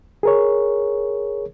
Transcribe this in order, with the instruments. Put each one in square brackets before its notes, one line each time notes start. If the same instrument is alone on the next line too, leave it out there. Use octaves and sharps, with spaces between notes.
[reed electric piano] G#4 A#4 C#5